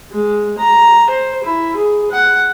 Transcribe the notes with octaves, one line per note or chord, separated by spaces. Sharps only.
G#3
A#5
C5
E4
G#4
F#5